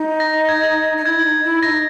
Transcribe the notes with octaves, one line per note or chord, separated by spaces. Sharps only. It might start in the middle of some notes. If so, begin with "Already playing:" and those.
Already playing: D#4
A#6
G#6
D#4
E4 G#6
D#4
E4
D#4 E4 A#6